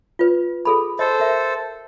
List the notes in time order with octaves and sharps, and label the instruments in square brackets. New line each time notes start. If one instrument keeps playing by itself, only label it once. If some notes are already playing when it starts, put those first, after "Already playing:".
[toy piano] F4 B4
G#4 A4 B5
[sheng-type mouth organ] A4 C5 [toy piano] D#5
[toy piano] A#4 E5